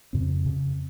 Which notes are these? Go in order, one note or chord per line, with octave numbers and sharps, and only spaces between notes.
F2 C#3 C4
F2 C#3